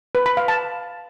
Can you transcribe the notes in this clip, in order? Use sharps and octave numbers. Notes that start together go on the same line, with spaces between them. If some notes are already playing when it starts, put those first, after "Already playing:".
B4
B5
F5
A5